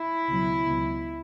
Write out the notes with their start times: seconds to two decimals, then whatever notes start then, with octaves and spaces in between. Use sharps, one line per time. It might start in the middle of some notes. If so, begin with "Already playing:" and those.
Already playing: E4
0.29 C#2 B2 F#3
0.66 C#2 B2 F#3